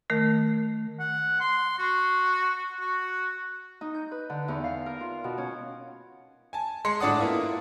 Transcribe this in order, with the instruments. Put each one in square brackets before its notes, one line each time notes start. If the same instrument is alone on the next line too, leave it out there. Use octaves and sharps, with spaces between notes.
[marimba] D#3 A3 A#4
[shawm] F#5
C6
F#4
F#4
[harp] D#4
G6
B4
D3
E2
F5
A#4
F4
B2
C#4
[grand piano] G#5 A5
G#3 C6 C#7
A2 D4 D5 F#5 D#6
A#3 B3 E4 F4